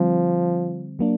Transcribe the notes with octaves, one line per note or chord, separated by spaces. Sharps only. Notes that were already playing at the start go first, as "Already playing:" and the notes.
Already playing: D3 F3 G3 C4
F#3 A#3 D4